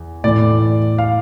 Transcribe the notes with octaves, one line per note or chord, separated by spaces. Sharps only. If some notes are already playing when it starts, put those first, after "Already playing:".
Already playing: E2
A2 E3 A3 D5
F5